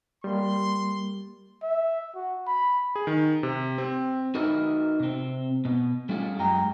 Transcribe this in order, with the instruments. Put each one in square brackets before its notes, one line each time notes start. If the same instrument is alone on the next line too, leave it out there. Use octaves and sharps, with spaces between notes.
[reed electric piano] G3 A#3 [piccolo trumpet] C6
[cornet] E5
F#4
B5
[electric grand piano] G#4
D#3
C3
C4
[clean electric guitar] D#4 F#4 A#4 B4 D#5 E5
C3 C4
B2 B3
G3 A3 C#4 F4 G#4
F#2 G#3 G5 A#5